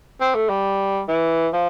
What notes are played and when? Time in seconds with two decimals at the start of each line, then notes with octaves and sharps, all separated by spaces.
0.21 C4
0.35 A3
0.49 G3
1.08 E3
1.53 F3